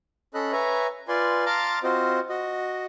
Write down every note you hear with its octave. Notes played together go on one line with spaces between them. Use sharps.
C#4 A4 D#5 B5 F#6
B4 C#5 E5 G#5 A#5
F4 B4 D5 G#5 C6
F5 A5 A#5 C6 D6 F6
C4 F4 F#4 C5 D#5
F#4 D#5